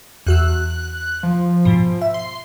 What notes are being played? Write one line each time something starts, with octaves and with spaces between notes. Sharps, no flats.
E2 F#4 E6 F#6
F3
G#2 B2
E5
C6